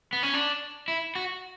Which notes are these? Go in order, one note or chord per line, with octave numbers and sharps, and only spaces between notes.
B3
C#4
D4
E4
F#4